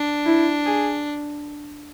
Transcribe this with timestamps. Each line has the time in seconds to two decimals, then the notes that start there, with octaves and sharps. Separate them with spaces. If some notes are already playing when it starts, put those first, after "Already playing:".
Already playing: D4
0.26 E4
0.66 G#4